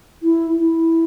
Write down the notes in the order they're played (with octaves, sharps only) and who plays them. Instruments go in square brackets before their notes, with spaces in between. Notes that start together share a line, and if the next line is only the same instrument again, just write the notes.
[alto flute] E4
E4